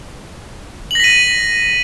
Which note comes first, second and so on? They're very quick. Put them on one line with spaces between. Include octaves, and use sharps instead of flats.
F#7 A#6 B6 D#7